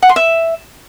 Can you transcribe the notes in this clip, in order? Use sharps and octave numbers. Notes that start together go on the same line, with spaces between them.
F#5
C6
E5